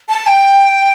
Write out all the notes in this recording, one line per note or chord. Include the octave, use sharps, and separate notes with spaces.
A5
G5